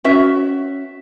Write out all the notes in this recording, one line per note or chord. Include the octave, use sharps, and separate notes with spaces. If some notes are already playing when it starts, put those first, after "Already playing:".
C#4 F#4 E5